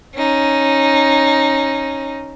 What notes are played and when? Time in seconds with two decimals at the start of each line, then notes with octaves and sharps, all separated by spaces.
0.16 C#4 D#4